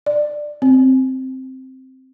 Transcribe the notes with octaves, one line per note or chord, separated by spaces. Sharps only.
D5
C4